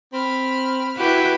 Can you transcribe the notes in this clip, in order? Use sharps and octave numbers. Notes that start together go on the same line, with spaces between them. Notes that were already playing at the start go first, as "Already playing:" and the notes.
C4 B5 F6
E4 F#4 G4 B4 B5